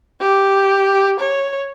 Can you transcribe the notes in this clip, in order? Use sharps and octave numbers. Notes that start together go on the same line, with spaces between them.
G4
C#5